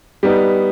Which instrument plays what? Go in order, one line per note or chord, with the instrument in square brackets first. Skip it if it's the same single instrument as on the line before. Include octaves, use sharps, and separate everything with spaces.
[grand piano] G3 B3 D#4